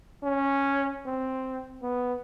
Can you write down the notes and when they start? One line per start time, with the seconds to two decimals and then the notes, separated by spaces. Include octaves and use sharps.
0.24 C#4
1.06 C4
1.82 B3